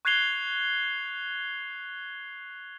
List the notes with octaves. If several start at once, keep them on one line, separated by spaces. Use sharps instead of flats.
C#6 F#6 G#6 C7 F7 G7